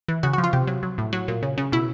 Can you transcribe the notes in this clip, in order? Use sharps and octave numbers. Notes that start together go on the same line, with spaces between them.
E3
C#3 F#4
F#4
F3
F4
C3 G4
F#3
F#3
A2
F#3 F#4
A#2
C#3
C#3
B2 E4